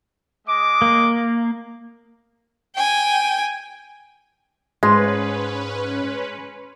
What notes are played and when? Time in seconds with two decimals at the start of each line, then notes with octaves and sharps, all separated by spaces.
0.47 G#3 D#5 D6
0.82 A#3
2.75 G5 G#5
4.83 G#2 G#3 C#4 B4 C6